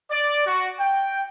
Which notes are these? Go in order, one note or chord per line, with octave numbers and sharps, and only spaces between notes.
D5
F#4
G5